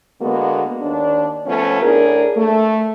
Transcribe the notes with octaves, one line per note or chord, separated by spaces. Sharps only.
D3 G#3 A#3 B3 F#4
D#2 D4
F3 A3 B3 C#4
A2 D4 G#4 A#4
A3